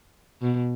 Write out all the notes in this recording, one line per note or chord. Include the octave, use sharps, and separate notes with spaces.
B2